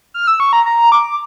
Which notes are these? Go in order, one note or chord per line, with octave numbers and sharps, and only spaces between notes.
F6
E6
C#6
A#5
A#5
D6